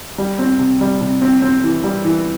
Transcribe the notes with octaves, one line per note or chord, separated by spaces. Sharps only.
G3
C4
C3
G3
C3
C4
C4
E3
G3
E3